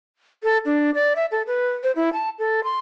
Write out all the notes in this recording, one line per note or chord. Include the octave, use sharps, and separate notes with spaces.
A4
D4
D5
E5
A4
B4
C5
E4
A5
A4
C6